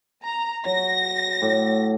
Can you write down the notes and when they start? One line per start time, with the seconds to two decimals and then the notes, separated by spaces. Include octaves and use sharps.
0.23 A#5
0.65 F#3 A#6
1.42 A2 D5